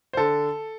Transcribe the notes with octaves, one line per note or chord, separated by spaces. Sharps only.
C5
D3 A4